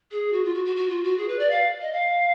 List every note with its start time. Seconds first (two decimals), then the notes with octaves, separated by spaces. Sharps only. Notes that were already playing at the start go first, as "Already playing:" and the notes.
0.11 G#4
0.33 F#4
0.44 F4
0.54 F#4
0.65 F#4
0.76 F#4
0.89 F4
1.03 F#4
1.18 G#4
1.28 B4
1.39 D5
1.50 F5
1.81 D#5
1.93 F5